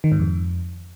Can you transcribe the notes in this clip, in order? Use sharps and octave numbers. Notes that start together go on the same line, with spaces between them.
D#3
G#2
F2